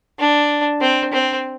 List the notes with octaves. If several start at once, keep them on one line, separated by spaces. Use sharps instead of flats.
D4
C4
C4